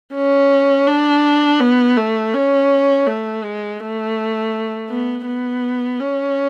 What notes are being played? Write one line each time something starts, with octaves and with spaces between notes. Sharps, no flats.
C#4
D4
B3
A3
C#4
A3
G#3
A3
B3
B3
C#4